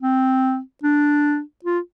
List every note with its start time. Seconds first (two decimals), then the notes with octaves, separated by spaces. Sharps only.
0.02 C4
0.83 D4
1.65 F4